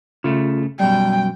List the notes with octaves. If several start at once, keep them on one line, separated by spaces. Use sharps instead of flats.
C#3 A3 F4
F#2 B2 G3 G5